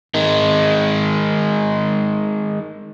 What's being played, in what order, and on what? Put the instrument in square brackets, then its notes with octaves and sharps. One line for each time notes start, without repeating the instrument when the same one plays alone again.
[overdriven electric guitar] D#3 G#3